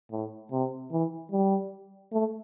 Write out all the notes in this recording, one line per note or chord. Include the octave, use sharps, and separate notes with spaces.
A2
C3
E3
G3
A3